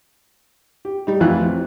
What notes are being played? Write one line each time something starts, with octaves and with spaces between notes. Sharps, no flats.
G4
G3 D#4
A1 F2 E3 F4 F#6
C4